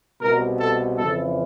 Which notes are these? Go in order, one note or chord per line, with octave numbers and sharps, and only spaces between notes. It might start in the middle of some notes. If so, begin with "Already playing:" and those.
C2 B2 A#4
A4
F2 C#3 E3 A4